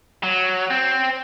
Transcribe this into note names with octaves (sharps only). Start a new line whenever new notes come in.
F#3
C4